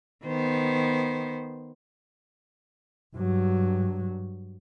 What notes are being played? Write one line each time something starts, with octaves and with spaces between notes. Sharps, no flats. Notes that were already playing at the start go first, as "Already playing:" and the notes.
D#3 B3 C5
G2 F#3